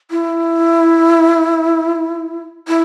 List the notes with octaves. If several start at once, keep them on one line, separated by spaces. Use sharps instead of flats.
E4
E4